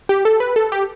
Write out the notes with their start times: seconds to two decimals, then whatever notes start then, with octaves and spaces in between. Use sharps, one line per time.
0.09 G4
0.25 A4
0.40 B4
0.56 A4
0.72 G4